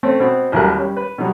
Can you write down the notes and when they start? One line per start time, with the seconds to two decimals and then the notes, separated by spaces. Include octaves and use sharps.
0.03 A3 C4 C#4
0.20 B2 C4
0.52 A1 D#2 F#3 G3 A#4 F#6
0.78 G3 C#4
0.97 B4
1.18 B2 F#3 G3